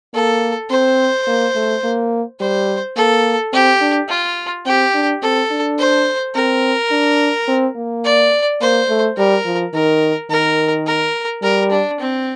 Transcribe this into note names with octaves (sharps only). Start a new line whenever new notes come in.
A#3 A4
C4 C5
A#3
A3
A#3
G3 C5
A#3 A4
C4 G4
D4
F4
C4 G4
D4
C4 A4
D4
C5
C4 A#4
D4
C4
A#3
D5
A#3 C5
A3
G3 A#4
F3
D#3 A#4
D#3 A#4
A#4
G3 A#4
D4
C4